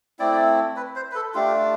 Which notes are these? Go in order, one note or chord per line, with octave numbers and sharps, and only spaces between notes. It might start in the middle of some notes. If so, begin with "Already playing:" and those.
A3 C4 E4 D5
B4
C5
B4
A4
A3 D4 F4 G4